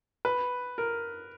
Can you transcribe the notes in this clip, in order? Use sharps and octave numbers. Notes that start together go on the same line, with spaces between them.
B4
A#4